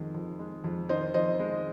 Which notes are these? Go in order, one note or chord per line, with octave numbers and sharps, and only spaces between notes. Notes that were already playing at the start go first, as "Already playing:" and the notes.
Already playing: F2 D#3 G#3
F2
G#3
F2
D#3 C5 D#5
F2 C5 D#5
G#3